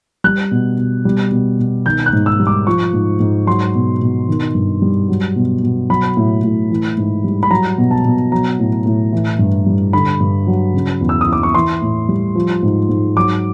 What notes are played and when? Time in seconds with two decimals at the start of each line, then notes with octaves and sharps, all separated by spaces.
0.24 G3 F#6
0.51 B2
0.78 B2
1.05 G3
1.32 B2
1.59 B2
1.86 D#3 G6
2.06 F#6
2.13 G#2
2.26 E6
2.40 G3
2.47 D6
2.67 F3 C#6
2.93 G#2
3.20 G#2
3.47 F#3 C6
3.75 B2
4.02 B2
4.28 D#3
4.55 G2
4.82 G3
5.09 F#3
5.36 B2
5.63 B2
5.90 F#3 B5
6.17 A2
6.43 A2
6.70 E3
6.98 G#2
7.24 G3
7.43 B5
7.51 F#3 A#5
7.78 B2
7.91 A5
8.05 B2
8.32 F#3 A#5
8.59 A2
8.86 A2
9.13 E3
9.39 G2
9.66 G3
9.93 D3 B5
10.20 G2
10.47 F#3
10.74 C#3
11.01 E2
11.09 E6
11.21 D#6
11.28 E3 D6
11.43 C#6
11.54 E3 C6
11.82 A2
12.09 G3
12.35 F3
12.63 G#2
12.89 G#2
13.16 F#3 D6